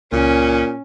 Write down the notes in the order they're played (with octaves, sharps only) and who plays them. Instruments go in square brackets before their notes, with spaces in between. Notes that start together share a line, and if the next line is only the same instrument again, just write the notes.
[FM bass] C#2 [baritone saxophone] A#2 [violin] C#4